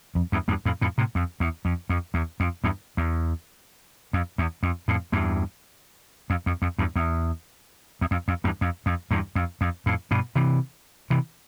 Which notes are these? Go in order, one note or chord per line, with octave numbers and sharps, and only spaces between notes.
F2
E2 G2
E2 G2
F2 A2
F2 A2
A2 C3
F2
E2
F2
F2
E2
F2
E2 G2
E2
F2
E2
F2
F2 A2
E2 G2
F2
F2
F2
E2 G2
E2
E2
F2
F2
E2 G2
F2
F2
E2 G2
F2
F2
F2 A2
G2 B2
C3 E3
C3 E3